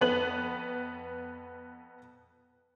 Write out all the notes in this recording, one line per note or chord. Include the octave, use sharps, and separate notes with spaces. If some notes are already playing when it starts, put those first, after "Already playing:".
F2 B3 B4 F#7